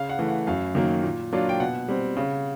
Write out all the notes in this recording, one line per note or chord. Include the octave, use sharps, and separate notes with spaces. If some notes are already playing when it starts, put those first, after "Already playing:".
Already playing: C#3 F5
F#5
E3 A3
F#5
F#2 F5
D#3 F#3 A#3
A#2
F#3 A#3 D4 F4
G5
B2 F#5
G3 C4
C#3